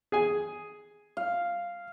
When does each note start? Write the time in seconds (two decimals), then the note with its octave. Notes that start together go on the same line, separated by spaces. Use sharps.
0.12 G#4 G#5
1.17 F5